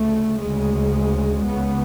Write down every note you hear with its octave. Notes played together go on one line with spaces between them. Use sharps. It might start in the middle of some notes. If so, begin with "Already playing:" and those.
Already playing: D2 C#3 A3
D2 C#3 G#3
C#2 C#3 B3